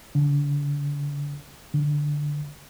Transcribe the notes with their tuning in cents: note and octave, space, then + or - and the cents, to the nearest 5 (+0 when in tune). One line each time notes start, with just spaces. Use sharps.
D3 -35
D3 +0